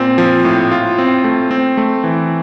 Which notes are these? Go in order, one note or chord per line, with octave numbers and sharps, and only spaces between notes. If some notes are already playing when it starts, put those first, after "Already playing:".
Already playing: A#2 C4
F3
A2
F4
C4
A3
C4
A3
E3